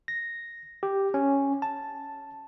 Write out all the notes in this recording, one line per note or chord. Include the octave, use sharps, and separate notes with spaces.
A#6
G4
C#4
A5